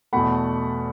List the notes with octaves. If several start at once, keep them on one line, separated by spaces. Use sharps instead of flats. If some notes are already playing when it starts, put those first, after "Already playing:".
E2 B2 A3 F#5 B5